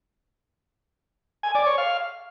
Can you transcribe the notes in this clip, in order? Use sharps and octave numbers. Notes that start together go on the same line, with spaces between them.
G#5
D5
C#5
F5